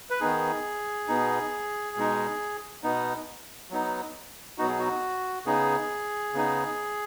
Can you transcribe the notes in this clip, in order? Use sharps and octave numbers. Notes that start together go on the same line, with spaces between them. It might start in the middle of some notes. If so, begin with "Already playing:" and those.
B4
D#3 B3 D#4 G#4
B2 B3 D#4
B2 G#3 D#4
B2 B3 D#4
F#3 B3 D#4
B2 F#3 B3 D#4 F#4
G#4
F#4
C#3 B3 D#4 G#4
C#3 B3 D#4